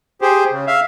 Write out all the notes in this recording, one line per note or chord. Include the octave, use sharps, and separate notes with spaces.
G4 G#4 C5
C#3
E5 F5